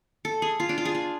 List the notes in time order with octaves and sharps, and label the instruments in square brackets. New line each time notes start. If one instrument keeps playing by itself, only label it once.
[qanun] A4
G#4
F4
D4
F4
G#4
F4